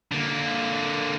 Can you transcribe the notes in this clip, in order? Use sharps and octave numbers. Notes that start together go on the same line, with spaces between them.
D3 A#3